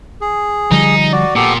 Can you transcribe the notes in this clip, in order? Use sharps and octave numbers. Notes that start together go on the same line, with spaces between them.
G#4
D3 F3 G3 D#4
F#4 D5
A#2 B3 G4 A4